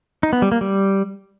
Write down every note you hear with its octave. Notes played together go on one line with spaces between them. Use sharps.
D#4
B3
G3
A#3
G3